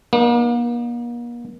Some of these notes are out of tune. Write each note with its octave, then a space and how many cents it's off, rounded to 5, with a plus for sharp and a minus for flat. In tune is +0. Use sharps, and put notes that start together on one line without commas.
A#3 +40 D#4 -25